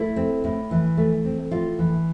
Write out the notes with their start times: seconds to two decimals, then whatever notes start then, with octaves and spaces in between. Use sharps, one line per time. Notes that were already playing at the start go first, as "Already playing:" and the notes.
Already playing: A3 E4
0.16 C4
0.44 A2
0.71 E3
0.97 A3
1.25 C4
1.51 A2 F4
1.79 E3